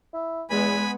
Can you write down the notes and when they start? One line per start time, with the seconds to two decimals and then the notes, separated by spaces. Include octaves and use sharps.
0.14 E4
0.50 E2 G#3 B3 G#5 B5